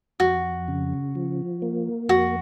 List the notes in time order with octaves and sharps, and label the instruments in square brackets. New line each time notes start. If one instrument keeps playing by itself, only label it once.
[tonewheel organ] F2 [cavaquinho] F#4
[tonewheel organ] C#3
F3
A#3
[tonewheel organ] F2 [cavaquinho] F#4